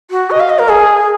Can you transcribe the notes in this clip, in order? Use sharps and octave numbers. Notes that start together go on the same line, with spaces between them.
F#4
D#5
F5
D#5
A#4
G#4